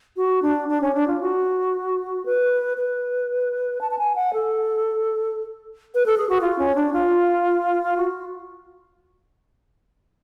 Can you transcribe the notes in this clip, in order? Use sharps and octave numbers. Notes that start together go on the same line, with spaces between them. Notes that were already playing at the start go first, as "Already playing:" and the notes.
F#4
D4
D4
C#4
D4
F4
F#4
B4
B4
A5
A5
G#5
F#5
A4
B4
A4
G#4
F#4
F4
C#4
D4
F4
F#4